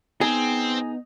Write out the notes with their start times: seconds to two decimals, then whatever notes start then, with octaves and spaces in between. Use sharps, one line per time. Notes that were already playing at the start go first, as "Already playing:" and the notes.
0.21 B3 C4 D#4 G#4